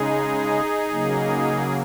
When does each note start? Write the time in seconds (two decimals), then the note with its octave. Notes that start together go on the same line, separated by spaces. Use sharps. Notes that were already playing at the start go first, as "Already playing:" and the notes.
Already playing: C#3 G#3 D#4 G#4
0.90 C#3 F#3 A#3